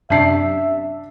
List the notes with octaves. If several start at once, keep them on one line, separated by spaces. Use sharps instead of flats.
F#2 C3 D4 E5 A5 C7